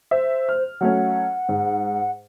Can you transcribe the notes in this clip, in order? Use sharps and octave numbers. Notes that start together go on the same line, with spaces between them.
C5 E5
F6
F#3 A3 C#4 F#5
G#2